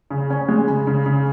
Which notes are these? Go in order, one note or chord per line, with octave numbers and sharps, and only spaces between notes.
C#3
C#4
G#3
C#3
C#3
C#3